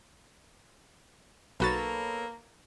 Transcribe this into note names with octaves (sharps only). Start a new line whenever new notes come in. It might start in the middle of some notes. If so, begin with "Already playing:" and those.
B1 A#3 B3 F#4 A4 C#5 A6